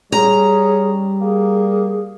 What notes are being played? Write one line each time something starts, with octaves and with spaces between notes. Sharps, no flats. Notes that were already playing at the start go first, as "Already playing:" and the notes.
G3 C#4 G#4 A#5
A#3 G#4